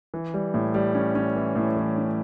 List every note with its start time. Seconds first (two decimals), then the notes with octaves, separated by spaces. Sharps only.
0.14 E3
0.34 G3
0.54 A2
0.74 G3
0.95 C#4
1.15 C#4
1.36 E3
1.55 A2
1.76 E3
1.98 C#4